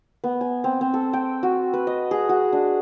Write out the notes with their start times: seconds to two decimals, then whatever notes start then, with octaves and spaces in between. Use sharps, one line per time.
0.24 B3
0.41 G#5
0.64 C4
0.81 C4
0.94 A4
1.13 G5
1.43 F#4
1.74 B4
1.87 D#5
2.11 G#4
2.29 F#4
2.53 D4